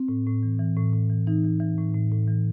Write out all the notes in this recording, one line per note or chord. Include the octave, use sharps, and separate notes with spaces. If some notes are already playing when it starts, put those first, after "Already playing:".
Already playing: C4
A2
A2
E3
E3
A2
A2
E3
E3 D#4
E3
E3
A2
A2
A2
E3